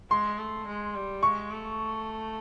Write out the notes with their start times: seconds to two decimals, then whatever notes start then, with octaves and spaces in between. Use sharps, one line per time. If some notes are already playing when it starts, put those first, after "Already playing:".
0.11 G#3 C6
0.39 A3
0.67 G#3
0.95 G3
1.23 G#3 C#6
1.51 A3